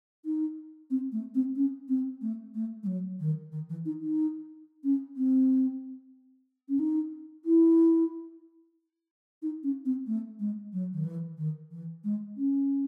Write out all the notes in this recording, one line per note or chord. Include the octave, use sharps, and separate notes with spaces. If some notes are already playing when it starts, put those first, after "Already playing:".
D#4
C4
A3
C4
C#4
C4
A3
A3
G#3
F#3
D#3
D#3
E3
D#4
D#4
C#4
C4
C#4
D#4
E4
D#4
C#4
C4
A3
G#3
F#3
D#3
E3
D#3
E3
G#3
C#4